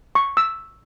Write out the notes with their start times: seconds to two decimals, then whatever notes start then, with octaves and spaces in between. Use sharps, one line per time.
0.15 C#6
0.37 E6